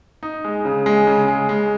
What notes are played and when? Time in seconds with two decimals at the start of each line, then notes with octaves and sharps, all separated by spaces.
0.23 D#4
0.45 G#3
0.65 C#3
0.86 G#3
1.07 C#3
1.28 G#3
1.49 G#3